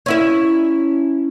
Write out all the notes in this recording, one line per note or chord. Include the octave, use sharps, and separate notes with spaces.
C#4 E4 E5